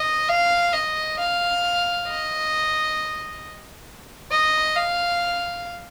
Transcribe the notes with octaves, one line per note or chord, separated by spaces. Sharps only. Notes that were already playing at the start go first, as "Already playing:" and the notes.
Already playing: D#5
F5
D#5
F5
D#5
D#5
F5